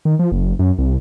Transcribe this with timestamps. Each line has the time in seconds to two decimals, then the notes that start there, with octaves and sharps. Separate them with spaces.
0.05 D#3
0.19 F3
0.32 F#1
0.59 F#2
0.78 C2